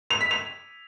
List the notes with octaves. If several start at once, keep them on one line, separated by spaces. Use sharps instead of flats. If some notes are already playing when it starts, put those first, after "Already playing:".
F7
B6
F7